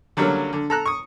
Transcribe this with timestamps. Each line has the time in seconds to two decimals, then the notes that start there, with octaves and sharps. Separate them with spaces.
0.17 D3 F#3 G3 A#3 C#4
0.53 D3
0.70 A4 A#5 F#6
0.86 C#6 D#6